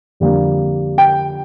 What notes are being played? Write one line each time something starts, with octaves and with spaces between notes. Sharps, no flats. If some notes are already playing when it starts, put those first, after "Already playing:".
F2 D3 G3 A#3 D4
G5